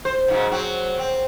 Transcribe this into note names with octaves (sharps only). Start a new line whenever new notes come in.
C5
G#2 C#3 F#3
F#3 C4
C4